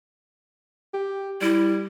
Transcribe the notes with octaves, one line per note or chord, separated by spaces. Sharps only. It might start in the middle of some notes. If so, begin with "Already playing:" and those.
G4
G3 E4